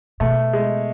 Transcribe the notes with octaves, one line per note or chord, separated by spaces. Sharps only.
B2 A3
G#3